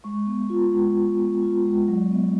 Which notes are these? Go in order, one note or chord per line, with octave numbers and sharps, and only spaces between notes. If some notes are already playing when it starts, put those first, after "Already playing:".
G#3 C#6
B3
F4
G#3
G#3
B3
F4
G#3
F#3
B3